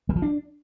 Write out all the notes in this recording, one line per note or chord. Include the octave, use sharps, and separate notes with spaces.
G3
F3
D4